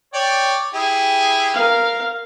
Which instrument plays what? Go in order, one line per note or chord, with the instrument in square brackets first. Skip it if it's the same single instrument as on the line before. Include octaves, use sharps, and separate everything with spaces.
[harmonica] C#5 D5 G5
E4 G4 G#4
[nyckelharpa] A#4 F5